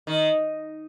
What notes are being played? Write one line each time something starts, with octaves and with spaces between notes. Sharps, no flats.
D#3